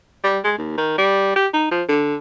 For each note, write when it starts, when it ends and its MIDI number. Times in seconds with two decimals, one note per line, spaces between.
0.24 0.38 55
0.44 0.54 56
0.58 0.76 39
0.77 0.95 51
0.98 1.34 55
1.36 1.47 67
1.54 1.69 63
1.71 1.83 53
1.89 2.15 50